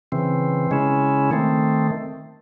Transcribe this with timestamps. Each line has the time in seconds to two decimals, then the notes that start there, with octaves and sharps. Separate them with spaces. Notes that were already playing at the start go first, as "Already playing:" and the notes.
0.12 C#3 E3 C4
0.71 C#3 G#3 C#4 E4
1.31 D#3 A3 C4